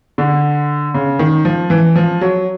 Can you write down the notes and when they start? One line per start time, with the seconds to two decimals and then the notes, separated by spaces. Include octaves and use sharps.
0.18 D3
0.94 C#3
1.19 D#3
1.45 F3
1.70 E3
1.96 F3
2.21 F#3